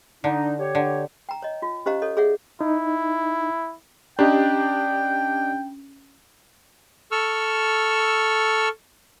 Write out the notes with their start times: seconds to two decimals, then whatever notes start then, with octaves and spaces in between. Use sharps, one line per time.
0.24 D3 D4 D#4
0.59 G4 C#5
0.75 D3
1.29 G5 A#5
1.43 C#5 D#5
1.62 F4
1.86 C#4 G4 C5 D#5 F5 A#5
2.02 A4 C#5 D#5
2.17 G#4 C#5 D5 E5 F#5
2.61 D#4 E4
4.19 C#4 D4 G4 D#5 G5
7.12 A4 C#6 E6 F6